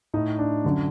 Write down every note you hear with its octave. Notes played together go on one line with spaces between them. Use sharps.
A2 D#4
D4
F#2 D3